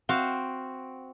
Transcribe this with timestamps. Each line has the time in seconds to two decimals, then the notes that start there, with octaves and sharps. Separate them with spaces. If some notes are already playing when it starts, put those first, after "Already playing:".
0.09 C4 F#4 F5